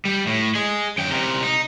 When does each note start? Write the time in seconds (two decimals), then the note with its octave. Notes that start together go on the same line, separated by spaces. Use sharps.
0.05 G3
0.27 A2
0.55 G#4 D#5
0.98 F#2 G5
1.11 C3 A#4
1.43 D#4